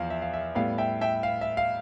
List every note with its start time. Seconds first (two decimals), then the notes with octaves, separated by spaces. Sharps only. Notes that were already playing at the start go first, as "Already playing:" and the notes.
Already playing: E2 F3 F5
0.10 E5
0.22 F5
0.33 E5
0.55 A2 G3 B3 F5
0.78 E5 G5
1.01 E5 G5
1.23 F5
1.41 E5
1.57 F5